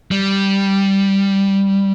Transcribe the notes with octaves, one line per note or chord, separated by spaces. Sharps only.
G3